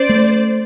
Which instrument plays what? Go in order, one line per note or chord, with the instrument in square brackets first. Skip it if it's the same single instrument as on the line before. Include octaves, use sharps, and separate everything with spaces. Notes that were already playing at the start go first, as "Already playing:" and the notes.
Already playing: [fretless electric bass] C#4 [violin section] C5 D5
[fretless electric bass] A3